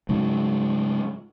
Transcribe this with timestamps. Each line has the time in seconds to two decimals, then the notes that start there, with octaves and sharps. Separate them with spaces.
0.09 G#2 C#3 F#3